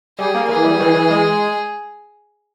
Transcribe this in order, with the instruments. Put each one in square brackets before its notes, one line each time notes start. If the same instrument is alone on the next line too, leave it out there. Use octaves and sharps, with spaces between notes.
[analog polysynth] G3 [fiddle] G#4
[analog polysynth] A#3
[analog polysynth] E3 [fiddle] G#4
[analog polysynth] G3
E3
E3
G#3